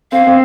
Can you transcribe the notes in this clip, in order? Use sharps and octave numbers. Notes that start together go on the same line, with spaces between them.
C4 F5
C4